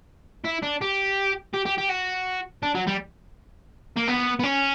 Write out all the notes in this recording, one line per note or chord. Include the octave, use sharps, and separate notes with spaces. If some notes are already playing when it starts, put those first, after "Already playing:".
E4
D4
G4
G4
G4
G4
F#4
D4
F#3
G3
A#3
B3
B3
C#4